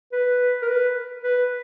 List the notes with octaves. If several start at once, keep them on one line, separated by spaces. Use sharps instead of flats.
B4
A#4
B4
B4